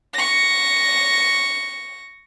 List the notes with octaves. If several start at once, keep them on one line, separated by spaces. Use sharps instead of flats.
C#6 A#6